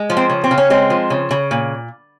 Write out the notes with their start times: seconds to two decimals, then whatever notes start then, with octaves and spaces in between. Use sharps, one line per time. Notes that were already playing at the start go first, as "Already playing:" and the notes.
Already playing: G#3
0.10 F3
0.17 C4
0.30 C#3
0.44 C4
0.51 C#3
0.58 C#4
0.70 G#3 C4
0.90 F3
1.10 C#3
1.31 C#3
1.51 A#2